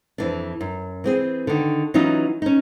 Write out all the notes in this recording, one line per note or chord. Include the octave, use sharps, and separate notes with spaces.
F2 E3 D4
F#2
E3 C4 G#4
D3 D#3
E3 F#3 C#4 D#4 F4
C#4 D#4